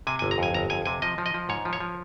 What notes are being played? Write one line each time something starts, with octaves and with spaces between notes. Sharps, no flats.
C3 G#5
G1 G#5
A#5
F2 G#5
G1 A#5
F2 G#5
C3 G#5
F3 D#5
F3
D#5
F3
G#2 C#5
F3
C#5
F3